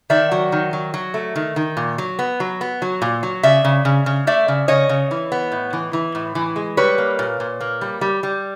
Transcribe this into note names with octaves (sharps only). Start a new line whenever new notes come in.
D#3 D5 E5
F#3
D#3
F#3
F#3
A3
D#3
D#3
A#2
F#3
B3
F#3
B3
F#3
A#2
F#3
C#3 D5 E5
C#3
C#3
C#3
A3 D5 E5
C#3
C#3 C#5 D#5
C#3
E3
B3
A2
E3
E3
A2
E3
G#3
G3 B4 C#5
A#3
A#2
A#2
A#3
G3
G3
G3